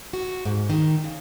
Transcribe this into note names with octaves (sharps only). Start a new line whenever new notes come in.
F#4
G#2
D#3
C#3